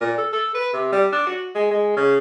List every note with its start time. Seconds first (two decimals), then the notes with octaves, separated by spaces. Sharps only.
0.01 A#2
0.18 A4
0.33 A4
0.55 B4
0.73 C3
0.92 G3
1.13 D4
1.27 F#4
1.55 G#3
1.71 G#3
1.97 C#3